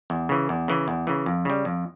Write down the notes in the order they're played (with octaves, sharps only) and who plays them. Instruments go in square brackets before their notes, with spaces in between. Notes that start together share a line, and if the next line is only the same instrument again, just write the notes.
[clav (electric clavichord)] E2
C#3 E3
E2
C#3 E3
E2
C#3 E3
F2
C#3 G3
F2